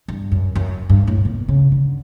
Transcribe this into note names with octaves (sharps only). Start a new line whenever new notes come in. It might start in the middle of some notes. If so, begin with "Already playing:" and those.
G2
F#2
F#2
G2
A2
B2
C#3
D3